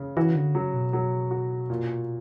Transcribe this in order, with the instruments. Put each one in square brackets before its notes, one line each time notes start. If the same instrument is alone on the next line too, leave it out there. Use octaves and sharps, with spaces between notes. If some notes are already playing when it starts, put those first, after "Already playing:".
Already playing: [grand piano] C#3
[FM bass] E3 [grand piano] F#4
[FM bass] D3
[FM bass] C#3 [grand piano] F#3
[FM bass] B2
[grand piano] F#3
F#4
A#2